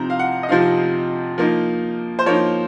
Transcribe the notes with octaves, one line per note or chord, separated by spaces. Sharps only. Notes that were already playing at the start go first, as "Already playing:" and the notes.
Already playing: C3 F3 C4 D#4 A#5
F5
F#5
D#5
C3 F3 C4 D#4 F5
F3 A#3 D#4
C5
F3 A#3 D#4 C#5